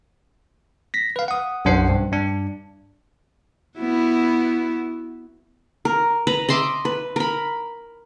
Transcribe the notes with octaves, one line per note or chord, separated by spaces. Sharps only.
A#6 B6
B4 F5
F#5 D#6
B1 F#2 D4 C5 F#5 C7
G2
G2 D4
B3 E4 F#4
A#4
B4 A#5
D#5 E5 C6 D6
B4
A#4 B5